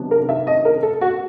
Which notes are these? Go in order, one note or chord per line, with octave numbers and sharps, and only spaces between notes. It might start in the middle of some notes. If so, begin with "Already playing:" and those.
Already playing: C3 D#3 F#3 B3 D4
A#4
E5
D#5
A#4
A4
F#4